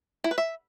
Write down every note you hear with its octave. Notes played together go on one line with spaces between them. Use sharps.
E4
B4
E5